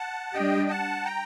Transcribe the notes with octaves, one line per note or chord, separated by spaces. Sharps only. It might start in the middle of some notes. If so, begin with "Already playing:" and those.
Already playing: F#5 A5
G3 D4 G4 D#5 G5
F#5 A5
G5 A#5